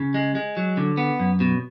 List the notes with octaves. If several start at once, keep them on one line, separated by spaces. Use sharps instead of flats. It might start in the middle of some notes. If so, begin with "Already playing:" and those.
Already playing: C#3
G#3
G#3
F#3
D3
B3
F#2
B2